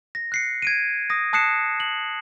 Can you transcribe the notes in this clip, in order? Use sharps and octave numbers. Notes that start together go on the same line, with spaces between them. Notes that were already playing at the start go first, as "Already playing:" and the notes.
A#6
F#6 C7 C#7
G#6 D7 D#7
D#6 A#6
A5 D#6 F#6 C7 C#7 E7
F#7